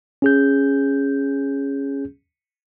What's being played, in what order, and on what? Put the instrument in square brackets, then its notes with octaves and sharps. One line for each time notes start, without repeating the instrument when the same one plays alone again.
[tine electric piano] C#4 G#4 G6